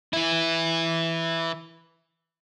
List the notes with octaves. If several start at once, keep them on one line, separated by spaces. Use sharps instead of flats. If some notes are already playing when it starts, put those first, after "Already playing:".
E3 E4